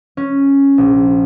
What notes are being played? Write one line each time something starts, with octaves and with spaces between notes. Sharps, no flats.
C#4
A#1